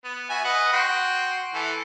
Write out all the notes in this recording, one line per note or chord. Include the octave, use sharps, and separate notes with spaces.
B3
F#4 E5 G#5
B4 D#5 F#5
F#4 G5 C6
E3 A4